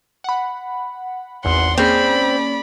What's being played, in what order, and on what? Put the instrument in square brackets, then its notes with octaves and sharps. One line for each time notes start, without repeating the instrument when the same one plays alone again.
[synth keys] F#5 B5
[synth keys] G#1 E2 [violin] F#5 C6
[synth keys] A#3 C#4 G#4 [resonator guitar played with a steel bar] C4 [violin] D5 B5